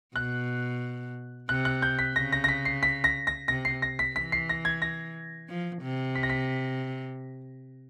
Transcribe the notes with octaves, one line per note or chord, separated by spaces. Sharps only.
B2 F#6
C3 F#6
F#6
G6
B6
C#3 A#6
A#6
A#6
B6
C7
B6
A#6
A#6
C3 A#6
C7
A#6
B6
E3 B6
C7
A#6
G#6
A#6
F3
C3
B6
A#6
B6